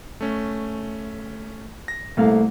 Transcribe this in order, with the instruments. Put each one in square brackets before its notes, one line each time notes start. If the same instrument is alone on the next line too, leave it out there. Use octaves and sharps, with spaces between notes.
[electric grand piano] A3 C#4
A#6
[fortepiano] C2 A#3 F5 [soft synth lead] A3